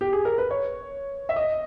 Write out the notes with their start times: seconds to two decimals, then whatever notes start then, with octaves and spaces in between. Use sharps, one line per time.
0.01 G4
0.13 G#4
0.25 A#4
0.38 B4
0.51 C#5
1.29 E5
1.36 D#5